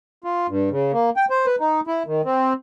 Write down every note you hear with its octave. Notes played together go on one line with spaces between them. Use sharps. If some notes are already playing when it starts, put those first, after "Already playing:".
F4
G2
C#3
A#3
G5
C5
B4
D#4
E4
D#3
C4